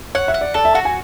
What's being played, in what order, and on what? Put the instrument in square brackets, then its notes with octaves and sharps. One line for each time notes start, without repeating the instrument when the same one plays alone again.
[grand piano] C#5 [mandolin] F#5
[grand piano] E5
[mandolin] F#5
[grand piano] D5
[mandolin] A4 [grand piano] D5
[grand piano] E5
[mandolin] F#4 [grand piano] F#5
[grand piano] G#5